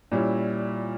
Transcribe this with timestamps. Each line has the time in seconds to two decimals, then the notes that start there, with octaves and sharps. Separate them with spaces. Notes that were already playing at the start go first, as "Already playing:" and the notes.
0.12 A#2 G3 C#4 E4